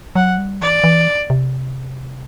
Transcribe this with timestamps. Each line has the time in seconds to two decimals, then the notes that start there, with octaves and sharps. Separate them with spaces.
0.15 F#3 F#5
0.38 G3
0.61 E3 D5
0.84 E3
1.30 C3